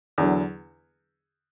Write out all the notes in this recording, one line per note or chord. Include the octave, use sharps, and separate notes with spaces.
E2 D3 F#3